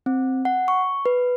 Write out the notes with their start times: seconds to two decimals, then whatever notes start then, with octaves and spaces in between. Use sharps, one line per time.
0.06 C4
0.45 F#5
0.68 C#6
1.06 B4